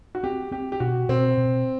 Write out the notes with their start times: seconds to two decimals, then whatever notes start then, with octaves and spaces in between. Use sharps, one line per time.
0.15 F#4
0.23 C4 G4
0.51 C4 G4
0.72 G4
0.80 B2 F#4
1.09 B2 C4
1.37 B2